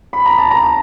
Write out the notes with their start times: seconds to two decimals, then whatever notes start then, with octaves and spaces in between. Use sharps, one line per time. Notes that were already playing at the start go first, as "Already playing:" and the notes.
0.13 B5
0.26 A#5
0.38 A5
0.51 A#5